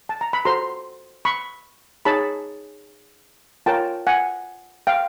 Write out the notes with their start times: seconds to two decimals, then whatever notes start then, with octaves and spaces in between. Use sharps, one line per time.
0.09 A5
0.21 A#5
0.33 B5
0.45 F#4 A4 C5 A#5 C6
1.25 B5 C#6
2.05 D#4 G#4 C#5 A5 B5
3.66 F4 A#4 C#5 G5 A5
4.07 F#5 G#5
4.87 F5 G5